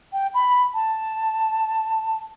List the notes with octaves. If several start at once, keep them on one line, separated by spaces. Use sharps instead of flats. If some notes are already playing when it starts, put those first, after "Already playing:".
G5
B5
A5